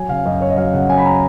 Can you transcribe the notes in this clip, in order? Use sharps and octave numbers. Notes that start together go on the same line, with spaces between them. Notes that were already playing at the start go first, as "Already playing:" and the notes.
Already playing: F#3 G#5
C#3 F5
F#2 D#5
F#2 C#5
D#5
F#3 F5
C#3 F#5
F#2 G#5
B5
A#5